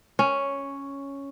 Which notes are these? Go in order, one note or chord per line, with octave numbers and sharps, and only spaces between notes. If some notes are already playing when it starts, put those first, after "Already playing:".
C#4